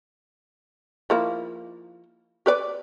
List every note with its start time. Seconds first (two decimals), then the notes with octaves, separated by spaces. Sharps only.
1.10 F3 A#3 E4
2.46 G4 B4 D5